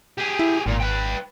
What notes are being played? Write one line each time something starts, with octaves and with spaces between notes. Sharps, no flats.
G4 G#4
E4
G#1 A#2
B4 G5